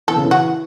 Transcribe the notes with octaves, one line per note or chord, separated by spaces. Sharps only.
E3 A4
C#3
E3
F#4